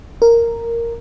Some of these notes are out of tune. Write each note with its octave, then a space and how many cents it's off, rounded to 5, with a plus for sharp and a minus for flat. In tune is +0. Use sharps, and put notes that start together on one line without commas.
A#4 -5